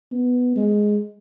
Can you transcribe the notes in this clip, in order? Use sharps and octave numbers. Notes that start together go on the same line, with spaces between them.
B3
G#3